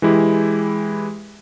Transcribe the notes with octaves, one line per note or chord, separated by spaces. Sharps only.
E3 G#3 E4 G4